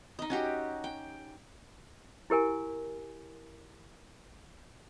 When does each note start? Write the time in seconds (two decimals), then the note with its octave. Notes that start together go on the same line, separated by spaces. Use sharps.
0.19 D#4 D#5
0.30 C#4 F#4 G4
0.84 G5
2.30 E4 G4 A#4 G#5